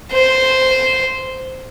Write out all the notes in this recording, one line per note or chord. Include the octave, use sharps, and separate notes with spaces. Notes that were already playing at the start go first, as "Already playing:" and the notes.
C5